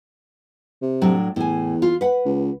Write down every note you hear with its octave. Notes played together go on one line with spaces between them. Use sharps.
C3
A2 F#3 D4
E2 A2 G#5
F4
B4 F#5
C#2